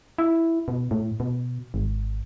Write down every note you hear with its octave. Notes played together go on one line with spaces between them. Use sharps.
E4
B2
A2
B2
G#1